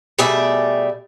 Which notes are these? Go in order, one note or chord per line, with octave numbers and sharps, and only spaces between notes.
B2 G3 A3 G#4 D5 E5